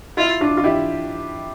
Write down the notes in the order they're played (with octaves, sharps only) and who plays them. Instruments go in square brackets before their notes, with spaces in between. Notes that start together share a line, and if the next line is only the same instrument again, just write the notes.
[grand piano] E4 [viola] F4
[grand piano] D4 F4
F4
E4 G4